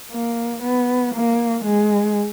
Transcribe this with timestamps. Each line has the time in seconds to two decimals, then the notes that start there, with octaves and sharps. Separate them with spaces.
0.12 A#3
0.63 B3
1.14 A#3
1.64 G#3